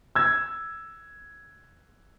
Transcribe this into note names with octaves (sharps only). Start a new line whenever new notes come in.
E6 G#6